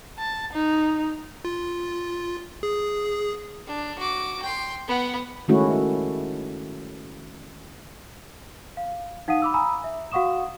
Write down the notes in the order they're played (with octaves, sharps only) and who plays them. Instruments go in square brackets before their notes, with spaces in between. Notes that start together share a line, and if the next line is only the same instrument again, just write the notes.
[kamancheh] A5
D#4
[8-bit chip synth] F4
G#4
[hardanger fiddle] D4
F#4 D6
G5 C6
B3 F#5
[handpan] D#3 G#3 A3 C#4 E4 F#4
[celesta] F5
D#4 F5 F#5 D#6 D#7
B5 D6 E6
G#5 A#5 B5 D#6 E6
E5
F#4 F5 F#5 C#6 D#6 E7